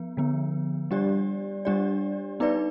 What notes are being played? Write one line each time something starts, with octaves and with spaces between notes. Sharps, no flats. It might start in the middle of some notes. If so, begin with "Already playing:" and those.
Already playing: F3 B3
D3 F3 B3
G3 D4 G4 D5
G3 D4 G4 D5
B3 D#4 B4 D5